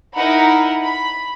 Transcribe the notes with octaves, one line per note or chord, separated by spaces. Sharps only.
D#4 E4 A#4 F#5 B5
B5